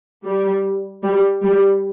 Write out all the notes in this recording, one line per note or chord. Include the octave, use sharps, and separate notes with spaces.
G3
G3
G3